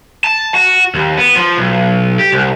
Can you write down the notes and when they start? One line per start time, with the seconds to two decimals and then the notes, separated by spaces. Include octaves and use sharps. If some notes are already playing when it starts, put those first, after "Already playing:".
0.24 A5
0.54 F#4
0.95 D#2
1.18 B3
1.36 F3
1.57 B1
2.19 G4
2.32 C2